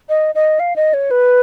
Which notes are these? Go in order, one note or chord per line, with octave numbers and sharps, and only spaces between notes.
D#5
D#5
F5
D#5
C#5
B4